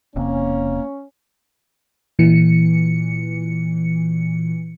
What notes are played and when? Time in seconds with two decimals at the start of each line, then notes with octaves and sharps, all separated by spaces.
0.16 E1 C3 A#3 C#4
2.19 A#2 E3 C#7